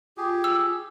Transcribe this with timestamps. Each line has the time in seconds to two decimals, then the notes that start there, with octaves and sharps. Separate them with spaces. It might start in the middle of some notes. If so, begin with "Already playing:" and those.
0.17 F4 G4 G#4
0.44 E6